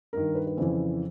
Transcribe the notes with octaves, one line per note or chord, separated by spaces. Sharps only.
G2 D#3 A#4
B4
B4
F2 C#3 E3 C5